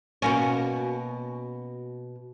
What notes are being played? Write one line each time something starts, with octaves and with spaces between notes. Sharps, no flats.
B2 A#3 C#4